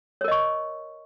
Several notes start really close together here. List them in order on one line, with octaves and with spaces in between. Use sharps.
C#5 A#4 D#5 C#6